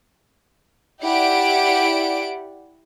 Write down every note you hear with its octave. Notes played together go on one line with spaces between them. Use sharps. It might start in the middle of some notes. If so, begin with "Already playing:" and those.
E4 G4 D5 F#5 D7